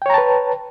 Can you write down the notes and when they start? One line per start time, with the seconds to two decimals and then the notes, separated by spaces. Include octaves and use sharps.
0.02 G5
0.06 C#5
0.10 A#5
0.14 A5
0.18 B4